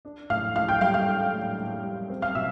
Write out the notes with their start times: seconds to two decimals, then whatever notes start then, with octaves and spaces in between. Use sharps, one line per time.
0.05 D4
0.30 A2 F5 F6
0.56 A2 F5 F6
0.68 G5 G6
0.81 G3 F5 F6
0.94 F5 F6
1.07 D4
1.33 A2
1.58 A2
1.84 G3
2.10 C4
2.22 F5 F6
2.35 B2 E5 E6